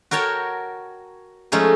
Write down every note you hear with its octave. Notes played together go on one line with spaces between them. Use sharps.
F#4 A#4 C#5 G5 A5
F3 G#3 A3 C#4 D#4